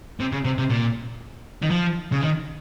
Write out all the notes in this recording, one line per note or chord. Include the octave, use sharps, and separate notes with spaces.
C3
C#3
C3
C3
A#2
D#3
F3
C#3
D#3